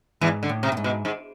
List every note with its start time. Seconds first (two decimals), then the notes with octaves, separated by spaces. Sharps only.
0.21 E2 G#2 E3
0.43 D3
0.49 A2
0.63 C3
0.72 A2
0.77 G#2
0.84 B2
1.05 G#2